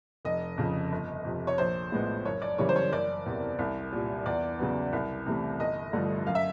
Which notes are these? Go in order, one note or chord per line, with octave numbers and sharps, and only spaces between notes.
F1 D#5
F2 C#3
G1
F2 C3
C#5
A#1 C5
A2 F3 G#3 B3
F#1 C#5
D5
F#2 C#3 E3 G3 C#5
C5
C#5
F#1 D5
E2 C3
C2
A#2 G3
E2 D5
C#3 F#3 B3
C2
C3 E3 A3
G1 D#5
G2 D3 F3 A3
F#2 F5
E5